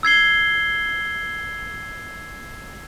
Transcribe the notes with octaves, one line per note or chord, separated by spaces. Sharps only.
E6 G#6 C7 G7